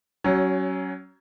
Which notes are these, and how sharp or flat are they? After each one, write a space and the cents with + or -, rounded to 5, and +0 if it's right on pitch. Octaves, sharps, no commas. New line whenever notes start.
F#3 +25 C#4 +0